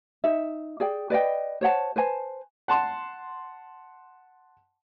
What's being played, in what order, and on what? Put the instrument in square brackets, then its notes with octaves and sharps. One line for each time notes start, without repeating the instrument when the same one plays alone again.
[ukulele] D#4 E5
G#4 D5 G5
B4 D5 D#5 G5
C5 C#5 F#5 A5
B4 C5 G#5 A5
[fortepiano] F#5 A5 C6